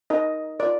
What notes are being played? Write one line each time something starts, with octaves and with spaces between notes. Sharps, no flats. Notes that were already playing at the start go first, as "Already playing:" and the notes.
D#4 A#4 D#5
F4 A#4 D5